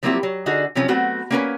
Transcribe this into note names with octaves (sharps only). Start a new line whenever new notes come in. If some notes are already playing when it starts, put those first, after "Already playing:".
F3 F#3 A#3 C4 E4 G4
F#3
D3 D#4 F#4 G#4
C3 F3 F#3 C#4
F#3 A3 B3 C4 F#4
A#3 B3 C#4 A#4 B4 G#5